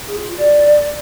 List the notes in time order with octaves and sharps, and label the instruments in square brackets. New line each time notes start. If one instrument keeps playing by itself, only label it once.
[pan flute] G#4
F4
F#4
D5